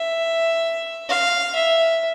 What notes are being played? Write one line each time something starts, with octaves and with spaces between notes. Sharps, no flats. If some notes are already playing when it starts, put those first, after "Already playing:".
Already playing: E5
F5
E5